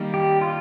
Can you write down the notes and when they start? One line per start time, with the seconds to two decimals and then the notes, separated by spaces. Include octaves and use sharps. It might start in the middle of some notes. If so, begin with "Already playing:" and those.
Already playing: D#3 G3 A#3 D#4
0.14 G4
0.41 F4